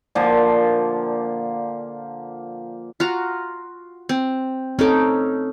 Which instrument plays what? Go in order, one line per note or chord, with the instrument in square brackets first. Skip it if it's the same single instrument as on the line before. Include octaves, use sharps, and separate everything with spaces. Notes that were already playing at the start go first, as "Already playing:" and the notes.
[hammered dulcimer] A#2 D3 F3 A#3
[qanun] F4 F#4 A#5
C4
[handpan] C4 A4 [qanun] C#4 D#4 D6